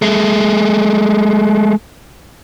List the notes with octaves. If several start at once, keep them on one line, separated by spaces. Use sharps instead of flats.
G#3 A3